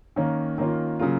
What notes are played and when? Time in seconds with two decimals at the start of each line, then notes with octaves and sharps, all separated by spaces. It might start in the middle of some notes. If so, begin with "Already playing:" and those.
0.16 D#3 A#3 C#4
0.58 D#3 A#3 C#4 F4
0.99 C#3 F#3 A#3 F4